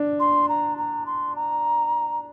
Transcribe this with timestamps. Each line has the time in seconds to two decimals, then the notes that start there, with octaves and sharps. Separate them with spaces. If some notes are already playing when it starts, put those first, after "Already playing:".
Already playing: D4
0.20 C6
0.49 A#5
0.78 A#5
1.06 C6
1.36 A#5